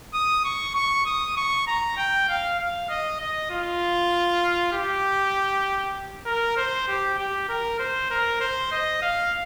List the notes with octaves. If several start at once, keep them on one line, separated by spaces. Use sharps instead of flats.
D#6
C#6
C#6
D#6
C#6
A#5
G5
F5
F5
D#5
D#5
F4
G4
A#4
C5
G4
G4
A#4
C5
A#4
C5
D#5
F5